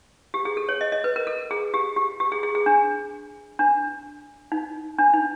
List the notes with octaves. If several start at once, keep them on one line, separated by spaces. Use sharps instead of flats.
G4
G#4
A4
C#5
D#5
D#5
B4
A#4
A4
G#4
G4
G4
G4
G#4
G#4
G#4
D4
D4
D#4
D4
D#4